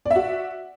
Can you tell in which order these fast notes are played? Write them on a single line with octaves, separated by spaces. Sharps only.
D5 E5 F#4